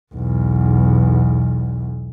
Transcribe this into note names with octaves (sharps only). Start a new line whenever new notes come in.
B1 E2